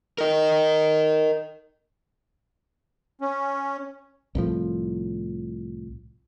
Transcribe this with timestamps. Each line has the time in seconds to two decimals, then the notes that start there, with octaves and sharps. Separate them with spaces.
0.18 A#4 D#5
3.21 C#4
4.35 C2 A2 F3